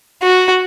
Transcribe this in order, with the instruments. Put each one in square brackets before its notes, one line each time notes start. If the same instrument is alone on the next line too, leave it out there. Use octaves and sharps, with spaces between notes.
[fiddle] F#4